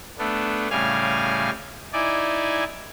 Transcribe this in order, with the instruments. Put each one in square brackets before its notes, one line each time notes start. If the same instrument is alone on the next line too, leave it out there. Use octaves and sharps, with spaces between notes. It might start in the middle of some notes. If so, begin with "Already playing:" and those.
[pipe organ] A3 B3 D4
A2 C#3 G3 F5 G#5 F6
D#4 E4 D5 G#5